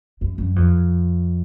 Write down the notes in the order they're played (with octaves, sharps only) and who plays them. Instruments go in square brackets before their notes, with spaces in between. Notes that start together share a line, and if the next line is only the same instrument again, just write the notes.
[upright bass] F#2
F#2
F2